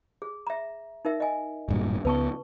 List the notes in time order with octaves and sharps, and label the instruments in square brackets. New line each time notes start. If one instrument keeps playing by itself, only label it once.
[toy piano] G#4
E5 A#5
D#4 A#4 E5
D#5 G#5
[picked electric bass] D1 G2 A#2
[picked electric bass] C#2 B3 [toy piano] B4 A5 C#6